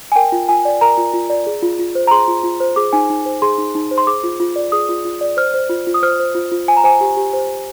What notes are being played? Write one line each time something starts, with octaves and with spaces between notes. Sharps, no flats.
G#5
A#4 G5
F4
F4 G#5
D5
A#4 A#5
F4
F4
D5
G#4
F4
F4
C5
A#5
G#4 C6
F4
F4
C5
G#4 D6
D#4 G#5
D#4
C5
G#4 C6
D#4
D#4
C5
C6
G#4 D6
F4
F4
D5
G#4 D#6
F4
F4
D5
C5 F6
C5
F4
F4
D#6
C5 F6
C5
F4
F4
C5 G#5
A#5
C5 G#5
G4
G4
C5
C5